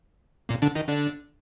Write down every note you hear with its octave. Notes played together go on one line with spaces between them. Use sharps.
A#2 A#3
D3 D4
D#3 D#4
D3 D4